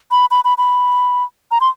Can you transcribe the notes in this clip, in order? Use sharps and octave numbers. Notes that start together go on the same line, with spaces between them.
B5
B5
B5
B5
A#5
C6